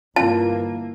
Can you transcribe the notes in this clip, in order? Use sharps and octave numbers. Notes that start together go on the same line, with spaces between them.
G1 E3 A#3 F4 A5